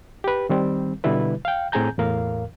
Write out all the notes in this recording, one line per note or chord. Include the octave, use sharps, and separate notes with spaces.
G4 B4
D#3 G3 C4
B2 D3 G3 E4 B4
F5 G5
A2 C4 G#4 G#5 A#5 G6
E2 A2 A#4 F5